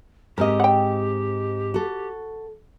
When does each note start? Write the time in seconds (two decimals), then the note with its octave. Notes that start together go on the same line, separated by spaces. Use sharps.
0.38 G#2 C4 G4 A#4 D#5
0.60 F#5 G5
1.74 F#4 A4